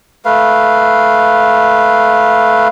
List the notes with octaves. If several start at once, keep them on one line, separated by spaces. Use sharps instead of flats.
A3 B4 F5